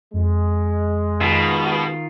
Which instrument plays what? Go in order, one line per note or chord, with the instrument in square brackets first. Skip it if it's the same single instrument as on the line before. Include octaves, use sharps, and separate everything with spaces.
[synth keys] F2 [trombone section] G#3
[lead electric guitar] B2 [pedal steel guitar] D#3 F4